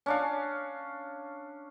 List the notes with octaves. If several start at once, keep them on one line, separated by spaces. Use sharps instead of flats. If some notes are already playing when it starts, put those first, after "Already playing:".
C#4 D4 F5